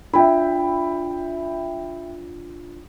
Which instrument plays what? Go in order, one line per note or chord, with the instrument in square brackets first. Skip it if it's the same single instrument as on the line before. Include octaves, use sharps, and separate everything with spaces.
[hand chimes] D4 F4 [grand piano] E5 G5 B5